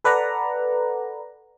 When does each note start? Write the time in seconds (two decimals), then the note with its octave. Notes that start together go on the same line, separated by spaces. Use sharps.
0.04 A4 B4 D5 F#5 A#5